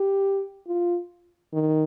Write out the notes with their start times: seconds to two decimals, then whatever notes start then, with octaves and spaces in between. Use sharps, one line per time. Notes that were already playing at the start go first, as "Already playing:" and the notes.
Already playing: G4
0.67 F4
1.54 D#3